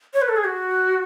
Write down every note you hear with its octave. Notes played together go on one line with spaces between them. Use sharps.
C#5
B4
A4
G#4
F#4